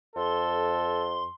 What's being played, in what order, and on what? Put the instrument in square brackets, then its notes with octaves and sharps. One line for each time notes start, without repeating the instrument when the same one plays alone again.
[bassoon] F2 [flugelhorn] A4 [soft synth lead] C6